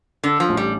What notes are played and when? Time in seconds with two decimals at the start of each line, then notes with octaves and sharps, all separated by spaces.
0.24 D3 D4
0.40 F3
0.49 A1
0.57 G3